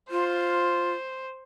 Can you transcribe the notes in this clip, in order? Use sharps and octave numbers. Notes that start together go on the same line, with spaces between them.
F4 C5